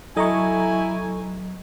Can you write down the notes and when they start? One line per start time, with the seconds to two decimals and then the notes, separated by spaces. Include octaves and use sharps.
0.17 F#3 E4 A4 D#5 G#5 A#5 C#6